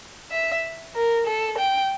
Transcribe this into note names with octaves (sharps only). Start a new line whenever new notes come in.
E5
A#4
A4
G5